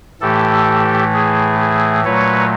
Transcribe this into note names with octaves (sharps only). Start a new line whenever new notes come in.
A2 E3 A3 G4 A4
G#4
G#4
A#2 F#3 A3 B4 C#5